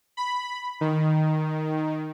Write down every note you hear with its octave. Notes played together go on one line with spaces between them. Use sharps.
B5
D#3